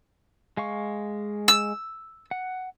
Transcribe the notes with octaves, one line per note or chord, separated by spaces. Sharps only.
G#3 F5 C#6
E6
F#5